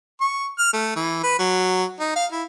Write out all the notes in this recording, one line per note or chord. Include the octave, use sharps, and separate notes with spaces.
C#6
F6
A3
E3
B4
F#3
D#4
F5
E4